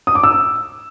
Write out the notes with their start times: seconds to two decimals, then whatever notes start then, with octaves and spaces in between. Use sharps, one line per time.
0.07 D#6
0.15 D6
0.24 E6